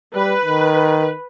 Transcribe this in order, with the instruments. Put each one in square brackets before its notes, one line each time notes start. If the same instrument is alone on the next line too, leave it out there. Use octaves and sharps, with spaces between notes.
[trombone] G3 [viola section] B4
[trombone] D#3